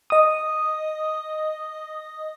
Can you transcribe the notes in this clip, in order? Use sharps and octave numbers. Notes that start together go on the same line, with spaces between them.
D#5 D#6